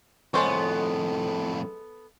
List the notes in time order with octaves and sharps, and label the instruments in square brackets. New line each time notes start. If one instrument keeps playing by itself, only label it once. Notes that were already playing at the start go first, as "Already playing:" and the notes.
[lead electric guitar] F2 A2 [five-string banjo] G#3 C5 C#5 [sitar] B3 A4